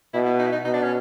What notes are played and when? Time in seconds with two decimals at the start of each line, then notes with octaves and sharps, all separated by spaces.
0.14 B2 E4
0.26 E4
0.39 D#4
0.46 E4
0.52 D#4
0.65 B2 D#4
0.74 D4
0.83 C#4